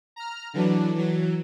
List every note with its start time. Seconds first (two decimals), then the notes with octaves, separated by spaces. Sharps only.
0.16 A#5 F6
0.54 D3 E3 F#3 D4
0.95 E3 F#3